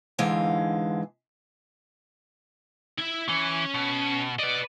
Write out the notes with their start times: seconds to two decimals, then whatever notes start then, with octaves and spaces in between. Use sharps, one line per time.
0.18 G#2 D3 E3 G#3 F5
2.99 E4 E5
3.29 E3 C#4
3.74 B2
4.39 B4 D5 D#5